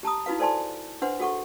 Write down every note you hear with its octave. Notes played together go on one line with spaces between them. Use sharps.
G4 A5 A#5 D#6
D#4 E4 F#4 B4 F5
A4 C5 D5 G#5 A5 C6
D4 B4 C5 F#5 C6
F#4 G#4 A4 F#5 C#6